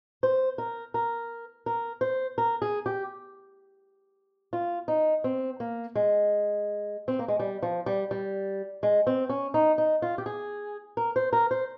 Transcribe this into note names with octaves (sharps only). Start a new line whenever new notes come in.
C5
A#4
A#4
A#4
C5
A#4
G#4
G4
F4
D#4
C4
A#3
G#3
C4
A#3
G#3
G3
F3
G3
G3
G#3
C4
C#4
D#4
D#4
F4
G4
G#4
A#4
C5
A#4
C5